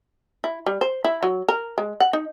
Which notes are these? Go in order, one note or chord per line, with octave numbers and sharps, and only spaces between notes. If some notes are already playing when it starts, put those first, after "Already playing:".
E4
G3
C5
E4
F#3
A#4
G#3
F#5
D#4